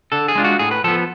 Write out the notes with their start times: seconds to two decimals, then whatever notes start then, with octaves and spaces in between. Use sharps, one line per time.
0.12 D3 A4
0.28 G#4
0.35 G#3 D4 F4
0.44 F#4
0.59 A2 G#4
0.71 B4
0.84 F3 B3 A4